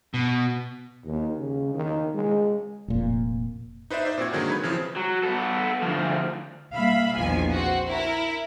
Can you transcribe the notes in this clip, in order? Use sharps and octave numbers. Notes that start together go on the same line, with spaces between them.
B2
D#2
C#3
D#3
G#3
F1 A#2
D#4 B4 C5 D5 E5
C5 D5 E5
A#2 C4 F#4 G#6
D3 D#3 F#3 G#3 A#3
B4 C#5 B5 G#6
C#3 E3 F3 C4 G#4
F#3
B3 A4
D2 F3
G3 A#3 E5 F5 B5
A#1 E2 D#3 F3 G#5
C4 F#4
E4 A#4